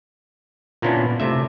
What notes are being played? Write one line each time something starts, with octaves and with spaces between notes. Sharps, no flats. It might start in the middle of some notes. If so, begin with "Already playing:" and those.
A#2 A#3 B3 C#4 D4 E4
C3 A3 E5